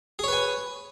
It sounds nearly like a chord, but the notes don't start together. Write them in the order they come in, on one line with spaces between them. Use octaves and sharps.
G#4 C#5 B4 G#5